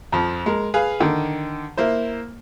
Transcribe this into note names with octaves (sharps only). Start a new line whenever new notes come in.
F2 F3
G#3 A#4
G#4 B4 F5
D3 D#3
A#3 E4 C5